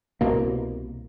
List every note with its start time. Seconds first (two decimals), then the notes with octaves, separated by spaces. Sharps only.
0.21 C2 B2 A#3